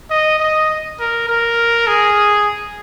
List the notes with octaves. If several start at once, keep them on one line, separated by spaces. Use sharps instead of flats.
D#5
D#5
A#4
A#4
G#4